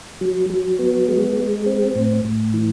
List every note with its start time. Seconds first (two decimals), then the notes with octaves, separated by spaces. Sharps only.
0.21 F#3
0.50 F#3
0.79 B3
1.08 G#3
1.37 G#3
1.66 C4
1.96 A2
2.25 A2
2.54 E3